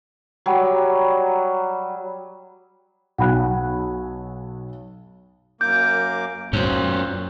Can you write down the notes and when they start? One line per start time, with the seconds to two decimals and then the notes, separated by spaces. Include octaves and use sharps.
0.46 F#3 G3
3.18 B1 F#5 G#5 B5 F#6
5.61 F#2 A#3 D6 G6
6.53 F#2 A#2 C#4 C5